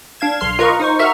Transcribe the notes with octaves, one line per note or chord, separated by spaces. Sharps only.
D4 F5 G#6 E7
B1 C6 F6 C7
F4 A#4 B4 D#5 A#5 C#6
D#4 C5 C#6
F#4 A#4 E5 C#6 F6